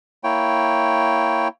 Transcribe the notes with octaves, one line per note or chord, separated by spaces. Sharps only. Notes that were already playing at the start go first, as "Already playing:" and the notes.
A#3 E4 C#5 G5